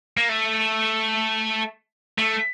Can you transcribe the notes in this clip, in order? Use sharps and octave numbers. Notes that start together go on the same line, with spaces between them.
A#3
A3
A3